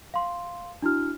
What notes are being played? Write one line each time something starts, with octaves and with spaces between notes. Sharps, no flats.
F5 C6
D4 E4 F#4 F6